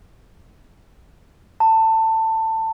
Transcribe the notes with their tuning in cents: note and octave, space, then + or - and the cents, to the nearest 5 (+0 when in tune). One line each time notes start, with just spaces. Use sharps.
A5 +20